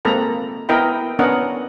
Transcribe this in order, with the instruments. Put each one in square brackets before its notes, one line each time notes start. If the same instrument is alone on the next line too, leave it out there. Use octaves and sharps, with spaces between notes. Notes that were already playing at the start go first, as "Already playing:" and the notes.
[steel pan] G#3 A#3 C4 A4 A#5 B5
B3 E4 A#4 D#5 G5 B5
B3 C#4 D4 A#4 D#5 F#5